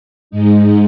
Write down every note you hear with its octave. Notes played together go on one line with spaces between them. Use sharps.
G#2 G#3 D#4